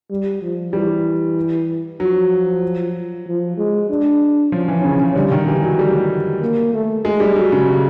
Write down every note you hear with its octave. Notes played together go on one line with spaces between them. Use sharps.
G3
F3
E3 G3
F3 F#3
F3
G#3
D4
F3 C#4
E3
C#3 C#4
C#3
D3 G3
D#3
E3 G3
F#3
G3 A3
A#3
A3
G#3 A3
G3
F#3 G#3
C#3